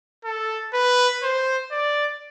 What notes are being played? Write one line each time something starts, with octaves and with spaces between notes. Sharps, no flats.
A4
B4
C5
D5